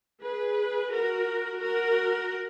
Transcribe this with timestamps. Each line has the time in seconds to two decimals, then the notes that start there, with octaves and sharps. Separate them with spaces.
0.22 G#4 B4
0.91 F#4 A#4
1.60 F#4 A#4